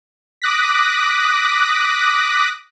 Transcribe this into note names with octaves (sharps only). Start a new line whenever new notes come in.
D6 D#6 F#6 A#6 B6